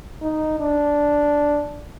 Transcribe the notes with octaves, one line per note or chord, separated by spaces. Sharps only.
D#4
D4